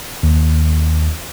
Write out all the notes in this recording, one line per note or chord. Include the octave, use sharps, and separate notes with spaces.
D#2